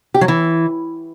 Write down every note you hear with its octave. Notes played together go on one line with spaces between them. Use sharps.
G4
F#3
E3